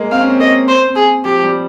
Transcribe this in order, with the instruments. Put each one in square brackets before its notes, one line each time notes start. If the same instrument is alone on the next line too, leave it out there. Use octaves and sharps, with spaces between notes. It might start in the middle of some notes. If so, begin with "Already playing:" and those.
Already playing: [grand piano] G#3 A#3
[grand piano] C4 [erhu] F5
[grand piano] C#4
C4
[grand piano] A#3 [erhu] D#5
[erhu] C5
[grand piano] C4
[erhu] G#4
[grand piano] F3 [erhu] G4
[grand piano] G3